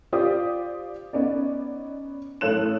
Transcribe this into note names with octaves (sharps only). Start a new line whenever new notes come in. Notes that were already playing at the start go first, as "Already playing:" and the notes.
F4 G4 C5 D5 D#6
B3 C#4 D#4 D5
A1 A4 C#5 F#6 E7